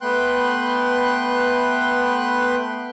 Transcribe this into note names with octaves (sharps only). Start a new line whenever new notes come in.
A3 B3 B4 G5 C6 F#6